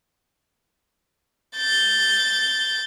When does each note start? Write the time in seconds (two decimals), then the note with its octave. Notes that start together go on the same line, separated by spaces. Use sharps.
1.57 G6 A6